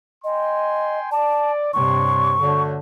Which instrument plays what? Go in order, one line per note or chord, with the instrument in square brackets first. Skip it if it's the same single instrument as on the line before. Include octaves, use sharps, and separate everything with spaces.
[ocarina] D#5 [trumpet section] G5 G#5 C6
[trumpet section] D5 [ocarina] A5
[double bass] G2 C3 [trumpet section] D4 C#5 C6 [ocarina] C#6
[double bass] D3 [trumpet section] A3 F#4 C#5